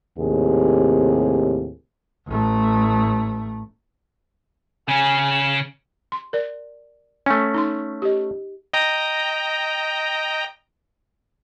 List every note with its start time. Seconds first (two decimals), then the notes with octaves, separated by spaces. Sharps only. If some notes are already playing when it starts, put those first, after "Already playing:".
0.18 D#2 A2 C3 G#4
2.28 A1 A3
4.88 C#3 C#4 G#5
6.12 C6
6.33 A#4 D5
7.26 A3 C#4 G#5
7.54 D#4 C6
8.02 G4 D#5
8.74 D#5 G5 A#5